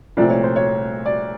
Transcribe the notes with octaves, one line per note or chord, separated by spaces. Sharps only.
C2 A#2 F3 A3 C4 D5
C#5
C5
C#5
D5